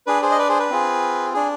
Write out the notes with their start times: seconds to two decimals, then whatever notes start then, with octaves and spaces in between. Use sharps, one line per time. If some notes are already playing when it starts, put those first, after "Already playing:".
0.07 D4 G#4 B4
0.22 G#4 C5
0.32 D#5
0.38 B4 D5
0.49 G#4 C5
0.60 B4
0.70 C4 F4 G#4
1.34 D4 G#4